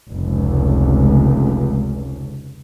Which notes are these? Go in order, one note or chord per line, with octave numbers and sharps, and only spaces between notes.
F1 C#2